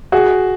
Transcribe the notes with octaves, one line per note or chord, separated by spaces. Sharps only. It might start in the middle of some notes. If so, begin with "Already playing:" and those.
F#4 G#4